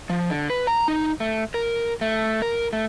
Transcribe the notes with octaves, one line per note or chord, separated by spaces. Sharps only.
F3
D3
B4
A#5
D#4
A3
A#4
A3
A#4
A3